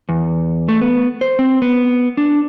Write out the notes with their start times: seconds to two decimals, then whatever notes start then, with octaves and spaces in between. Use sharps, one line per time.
0.09 E2
0.69 A3
0.81 B3
1.21 C5
1.39 C4
1.62 B3
2.17 D4